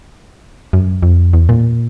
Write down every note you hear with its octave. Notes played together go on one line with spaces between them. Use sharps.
F#2
F2
E2
A#2